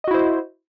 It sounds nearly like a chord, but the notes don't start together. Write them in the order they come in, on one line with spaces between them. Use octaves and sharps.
D#5 F#4 E4 C5